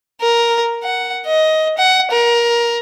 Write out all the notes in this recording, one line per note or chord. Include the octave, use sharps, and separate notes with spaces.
A#4
F#5
D#5
F#5
A#4